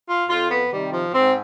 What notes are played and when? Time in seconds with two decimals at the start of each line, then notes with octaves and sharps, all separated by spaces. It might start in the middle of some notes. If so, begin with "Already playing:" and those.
0.09 F4
0.30 F2 F4
0.50 B3
0.71 C3 D#3 G3
0.93 F3
1.13 G#2 C4